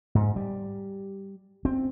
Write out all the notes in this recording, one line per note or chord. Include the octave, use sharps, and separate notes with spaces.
G#2
G3
C4